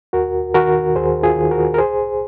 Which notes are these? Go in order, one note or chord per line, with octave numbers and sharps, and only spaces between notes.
D#2 F#4 A#4
D#3 F#4 A#4
D#2 G#4 C5
F4 G#4
D#3
F#4 A#4
A#4
C2 G#4 C5